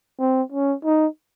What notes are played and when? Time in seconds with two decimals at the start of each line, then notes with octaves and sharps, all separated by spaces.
0.20 C4
0.52 C#4
0.84 D#4